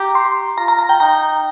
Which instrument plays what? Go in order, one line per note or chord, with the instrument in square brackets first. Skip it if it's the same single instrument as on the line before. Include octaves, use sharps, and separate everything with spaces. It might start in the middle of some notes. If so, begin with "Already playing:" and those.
Already playing: [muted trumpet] G4 [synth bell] A#5
[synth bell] C6
[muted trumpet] F4 [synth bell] A#5
[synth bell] A#5
A#5
G5
[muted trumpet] D#4 [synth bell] A#5